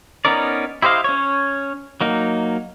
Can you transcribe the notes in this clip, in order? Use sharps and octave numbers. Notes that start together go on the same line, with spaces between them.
B3 C#4 D#4 A#4 D5
E4 G4 C5 D#5 F5
C#4 C#5
F#3 A#3 D#4